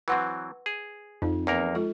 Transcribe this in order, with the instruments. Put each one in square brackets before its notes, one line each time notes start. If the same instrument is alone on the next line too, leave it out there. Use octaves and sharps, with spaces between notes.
[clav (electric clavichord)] E3 F#3 C4 [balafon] B4 F#5 C6
[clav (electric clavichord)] G#4
[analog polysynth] F2 [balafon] D#4
[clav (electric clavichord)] E2 A#3 A#4
[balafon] G#3 F4 A4